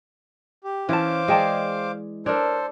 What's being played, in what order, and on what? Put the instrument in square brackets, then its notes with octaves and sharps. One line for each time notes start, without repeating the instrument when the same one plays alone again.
[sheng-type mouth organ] G4
[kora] E3 [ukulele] C#4 A5 [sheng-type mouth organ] C5 F5 D6
[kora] G#3 D5 [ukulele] G#4 G5 A5
[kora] D4 [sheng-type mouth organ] A4 C5 [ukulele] A#4 C#5